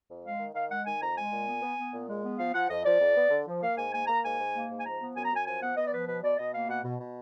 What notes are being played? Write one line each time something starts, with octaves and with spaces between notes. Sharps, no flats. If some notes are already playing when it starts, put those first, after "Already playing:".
F2
G#3 F5
D#3
D#3 F5
G#3 F#5
D#3 G#5
F2 A#5
G#3 G#5
A#2
B3
B3
B3
A#2
G#3
B3
F3 F5
F3 F#5
F2 D#5
F3 D5
F2
B3
D3
F3
A#3 F5
G#2 G#5
A#3 G#5
A#3 A#5
G#2 G#5
G#2
A#3
G#2
G#5
F3 A#5
B3
F#2 G#5
A#5
F#2 G#5
F3 G#5
B3 F#5
B3 D#5
D5
F3 B4
B2 B4
B2 D5
B2 D#5
A#3 F5
B2 F#5
B2
B2